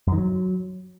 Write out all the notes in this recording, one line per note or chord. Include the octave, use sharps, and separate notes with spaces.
F#2
D#3
F#3